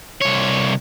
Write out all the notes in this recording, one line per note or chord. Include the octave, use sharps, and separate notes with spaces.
C2 C#5